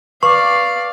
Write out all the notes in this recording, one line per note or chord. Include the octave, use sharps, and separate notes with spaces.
B4 D5 F5 C#6 D6